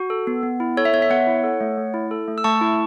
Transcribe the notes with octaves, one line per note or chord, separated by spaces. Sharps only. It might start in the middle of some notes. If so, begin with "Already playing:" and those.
Already playing: F#4
A4
B3
B3
E4
A4 C#5
E5
B3 C#5
E5
B3 C#5 F#5
E4
A4
A3
A3
E4
A4
A3
E6
A3 A5 C#6
E4